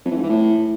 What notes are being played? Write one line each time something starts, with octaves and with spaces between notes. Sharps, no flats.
F2
E3
G#2
E3
A2